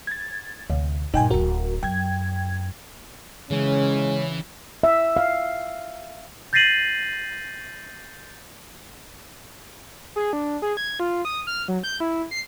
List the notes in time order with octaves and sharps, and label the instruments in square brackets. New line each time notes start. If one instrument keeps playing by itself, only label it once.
[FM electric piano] G#6 A6
[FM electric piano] D2 [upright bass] C3
[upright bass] G2 A#2 [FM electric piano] D#4 G5 G#5
[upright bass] D1 G#1 [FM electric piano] F#4 A#4
[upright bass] F#2 [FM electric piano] G5 G#6
[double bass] C#3 [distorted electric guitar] E3 [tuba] G#3 [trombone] C#4
[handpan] E5
F5
[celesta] G6 A6 A#6 C7 D#7 F#7
[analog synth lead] G#4
D4
G#4
G#6
F4
D#6
F6
F#3
G6
E4
C7